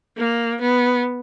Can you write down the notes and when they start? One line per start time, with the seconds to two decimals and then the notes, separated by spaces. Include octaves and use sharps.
0.17 A#3
0.61 B3